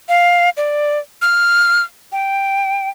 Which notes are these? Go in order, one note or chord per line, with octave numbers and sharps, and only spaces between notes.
F5
D5
F6
G5